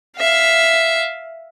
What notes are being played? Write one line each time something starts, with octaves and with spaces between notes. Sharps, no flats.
E5 F5